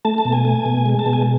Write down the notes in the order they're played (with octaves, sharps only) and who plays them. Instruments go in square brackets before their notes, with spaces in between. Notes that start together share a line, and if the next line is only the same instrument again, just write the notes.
[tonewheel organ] A3 A5
A5
B2
G#5
A3
B2
G#3
A5
B2
G#5